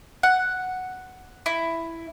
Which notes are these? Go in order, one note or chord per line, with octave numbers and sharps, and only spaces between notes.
F#5
E4